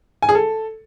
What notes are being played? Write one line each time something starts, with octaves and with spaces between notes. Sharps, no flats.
G#5
G#4
A4